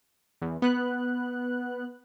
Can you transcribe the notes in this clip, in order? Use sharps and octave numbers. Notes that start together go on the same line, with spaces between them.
E2
B3 F#6